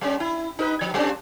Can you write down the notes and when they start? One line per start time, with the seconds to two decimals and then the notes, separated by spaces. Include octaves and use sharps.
0.01 G3 C#4
0.20 E4
0.59 D#4 A#4 B4
0.81 F3
0.94 G3 C#4 D4